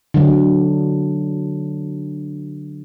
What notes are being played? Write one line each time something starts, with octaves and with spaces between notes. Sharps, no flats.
D3 F#3